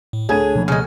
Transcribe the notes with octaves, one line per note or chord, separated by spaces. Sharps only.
A2
D2 D4 G#4 C#5 G#6 D#7
B2 F3 A#3
C#3 G#3 F6